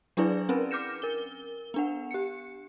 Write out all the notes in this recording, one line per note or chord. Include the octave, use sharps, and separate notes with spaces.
F#3 D4 E4 G#4 B4 D5
C4 C#4 A#4 B4
D6 F6 G6 A#6 C#7 E7
A#4 G7
B3 D4 F#5
G4 C#7